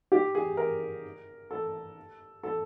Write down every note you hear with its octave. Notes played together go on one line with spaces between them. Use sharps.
G4
G#4
A#4
A4
A4